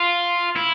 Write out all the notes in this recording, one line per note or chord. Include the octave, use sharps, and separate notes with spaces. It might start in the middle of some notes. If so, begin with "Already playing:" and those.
Already playing: F4
E4